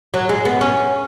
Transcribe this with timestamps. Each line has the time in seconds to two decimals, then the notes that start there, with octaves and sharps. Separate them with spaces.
0.14 F#3
0.29 G#3
0.45 B3
0.61 C#4